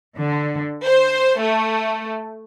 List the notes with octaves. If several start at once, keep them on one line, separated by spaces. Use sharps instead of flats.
D3
C5
A3